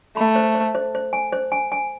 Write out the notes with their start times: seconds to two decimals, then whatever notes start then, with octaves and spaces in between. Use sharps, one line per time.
0.17 A3 B5
0.36 C5
0.55 C5
0.75 C5
0.95 C5
1.13 G#5
1.32 C5
1.52 G#5
1.72 G#5